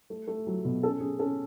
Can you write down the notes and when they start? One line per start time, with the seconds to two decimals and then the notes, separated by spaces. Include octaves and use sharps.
0.10 A3
0.28 A3
0.47 F#3
0.65 B2
0.83 C#4 A4
1.00 C#4 G#4
1.19 C#4 A4